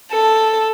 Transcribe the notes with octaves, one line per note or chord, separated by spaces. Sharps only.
A4